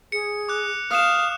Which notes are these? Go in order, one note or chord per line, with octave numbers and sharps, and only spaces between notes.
G#4 C#7
D6 F#6
F5 D#6 F6 E7